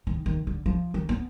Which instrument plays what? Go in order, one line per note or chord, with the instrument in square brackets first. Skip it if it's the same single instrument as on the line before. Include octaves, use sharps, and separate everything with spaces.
[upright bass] D#3
D#3
D3
F3
D#3
B3